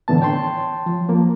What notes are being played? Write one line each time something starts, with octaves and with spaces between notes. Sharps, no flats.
A2 D3 E3 B3 A5
C#5 G5 A5 C6
F3
F3 A#3